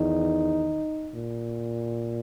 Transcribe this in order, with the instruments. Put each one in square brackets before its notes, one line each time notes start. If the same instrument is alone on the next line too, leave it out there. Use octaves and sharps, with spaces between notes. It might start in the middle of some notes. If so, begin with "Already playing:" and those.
Already playing: [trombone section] E2 D#3 D#4
A#2